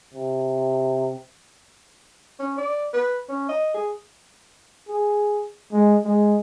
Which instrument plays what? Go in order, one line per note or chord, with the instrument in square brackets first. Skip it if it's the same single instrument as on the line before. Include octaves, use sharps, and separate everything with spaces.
[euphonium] C3
[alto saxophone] C#4
D5
B4
C#4
D#5
G#4
[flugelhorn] G#4
G#3
G#3